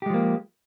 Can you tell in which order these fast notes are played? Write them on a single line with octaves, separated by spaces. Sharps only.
G4 G#3 F3 A#3